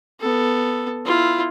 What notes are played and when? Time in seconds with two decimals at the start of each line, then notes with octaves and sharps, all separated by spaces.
0.20 B3 A4
1.05 E4 F4